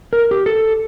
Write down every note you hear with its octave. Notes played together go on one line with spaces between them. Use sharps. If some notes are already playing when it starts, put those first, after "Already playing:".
A#4
G4
A4